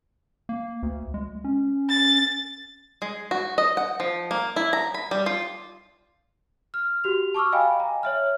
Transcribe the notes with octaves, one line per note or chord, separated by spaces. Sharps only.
A#3
D2
G#3
C#4
A6
G#3
F#4
D#5
F#5
F3
A#3
E4
A#5
B5
G3
F4
F6
F#4 G4 F7
A5 C#6 D6 E6 F6
D#5 F5 G5 G#5 B5
A#5
C#5 E5 F6